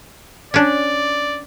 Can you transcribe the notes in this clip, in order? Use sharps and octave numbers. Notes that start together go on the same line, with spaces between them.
C#4 D4 D5